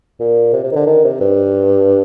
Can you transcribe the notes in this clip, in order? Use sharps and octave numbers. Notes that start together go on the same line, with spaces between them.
A#2
C3
C3
D#3
D3
D#3
C3
G2